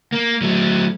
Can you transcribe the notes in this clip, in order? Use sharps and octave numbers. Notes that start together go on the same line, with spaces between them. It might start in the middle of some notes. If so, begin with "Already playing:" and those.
A#3
F#3 A3